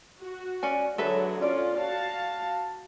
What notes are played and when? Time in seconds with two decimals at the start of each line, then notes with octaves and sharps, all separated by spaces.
0.20 F#4
0.63 C#4 D5 G#5
0.98 D3 F#3 G#4 A4 B4 E5
1.42 C#4 F4 D5
1.78 F#4 F5 A5